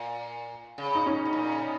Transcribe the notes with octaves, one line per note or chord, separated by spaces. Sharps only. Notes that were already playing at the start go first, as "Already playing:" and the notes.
Already playing: A#2
C#3
D#4
C#4
B2
A#2
C#3
B2